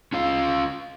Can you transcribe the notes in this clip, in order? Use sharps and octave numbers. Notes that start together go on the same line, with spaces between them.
C#4 F4 F5